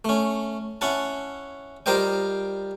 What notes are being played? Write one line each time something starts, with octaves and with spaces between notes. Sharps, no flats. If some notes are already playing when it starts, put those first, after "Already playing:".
A3 C#4
C#4 E4 F#5 A5
G3 F4 A#4 C5 D#5 G5